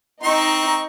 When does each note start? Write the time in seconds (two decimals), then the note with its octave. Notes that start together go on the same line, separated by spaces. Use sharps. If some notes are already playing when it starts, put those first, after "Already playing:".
0.23 C4 D#4 C#6